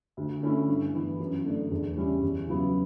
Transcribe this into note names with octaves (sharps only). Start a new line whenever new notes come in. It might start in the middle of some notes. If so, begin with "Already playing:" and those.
D2
D3 A3 C#4 E4
G2
E3 B3
F#2
D3 A3 D4
E2
C#3 G3 C#4 E4
E2
C#3 F#3 B3 E4